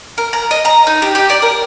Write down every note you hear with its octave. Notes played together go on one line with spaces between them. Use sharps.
A#4
A#5
D#5
A#5
D#4
G4
G4
D5
A#4